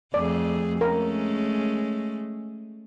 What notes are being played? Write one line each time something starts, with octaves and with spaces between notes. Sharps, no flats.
F2 A3 G#4 D5
G#3 A3 C#4 A#4